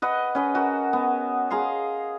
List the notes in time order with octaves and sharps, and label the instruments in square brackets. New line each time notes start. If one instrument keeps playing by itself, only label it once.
[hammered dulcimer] B4 D#5 F#5
C#4 B4 D#5
F#4 A#4
B3
G#4 F5 A#5 C6